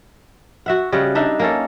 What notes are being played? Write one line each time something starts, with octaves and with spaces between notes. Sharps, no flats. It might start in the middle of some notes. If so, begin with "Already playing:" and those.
F#4 E5 F#5
C#3 G3 D#5 F#5
D4 D#4 E5
A#3 C#4 A4